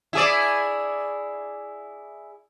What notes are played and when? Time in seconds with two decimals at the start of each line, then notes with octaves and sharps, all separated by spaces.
0.13 E4 G#4 D5